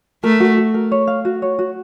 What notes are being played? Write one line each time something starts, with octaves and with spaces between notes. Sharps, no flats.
A3 A#4
F#4
F#4
A#4
C#5
F5
F#4
C#5
F#4